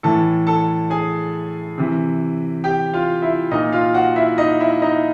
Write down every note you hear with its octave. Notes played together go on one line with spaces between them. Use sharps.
A2 E3 A4 A5
A4 A5
G#4 G#5
C3 E3
G4 G5
F4 F5
E4 E5
A#2 D#4 D#5
F4 F5
F#4 F#5
E4 E5
D#4 D#5
E4 E5
D#4 D#5